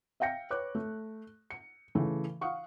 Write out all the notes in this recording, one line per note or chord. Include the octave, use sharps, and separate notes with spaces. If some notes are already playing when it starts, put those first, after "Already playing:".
E5 F5 G5 A#6 C#7
B4 C#5 D6 F#6
A3
C#7
C#3 E3 A3
F5 F#5 C#6 D#6